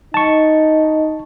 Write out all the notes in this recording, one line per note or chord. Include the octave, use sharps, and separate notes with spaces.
D#4 A5 C#6